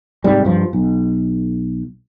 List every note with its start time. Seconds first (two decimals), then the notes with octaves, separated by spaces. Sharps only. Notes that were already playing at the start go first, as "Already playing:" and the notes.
0.24 G#2 C3 G3
0.45 G2 F3
0.73 B1